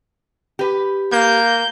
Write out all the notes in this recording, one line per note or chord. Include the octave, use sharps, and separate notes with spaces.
G4 B4
A#3 G6